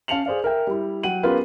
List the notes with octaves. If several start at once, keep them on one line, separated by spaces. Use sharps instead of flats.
C#4 F5 A5 C#7 F7 F#7
G#4 C5 D5 F5
A#4 E5 G5
G3 E4
F#3 F#5 G5 D#7 F#7
B3 C#4 F4 G4 A#4 B4